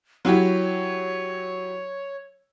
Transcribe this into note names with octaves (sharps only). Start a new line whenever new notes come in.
F#3 E4 G4 C#5